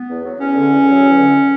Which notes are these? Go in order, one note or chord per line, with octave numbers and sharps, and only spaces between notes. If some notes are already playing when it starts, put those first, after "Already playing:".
Already playing: B3
E2
F#3
E2 C#4
D3
E2
F#3
E2
D3